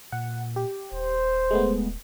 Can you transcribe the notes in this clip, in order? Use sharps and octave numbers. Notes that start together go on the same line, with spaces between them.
A#2 F#5
G4
D#1 C5
G#3 A3 B3